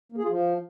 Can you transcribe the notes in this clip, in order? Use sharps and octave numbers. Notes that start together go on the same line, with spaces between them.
A#3
G#4
F4
F3